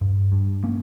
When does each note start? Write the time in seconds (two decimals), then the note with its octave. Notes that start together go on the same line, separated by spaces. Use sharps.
0.01 G2
0.32 G2
0.64 A#3 C#4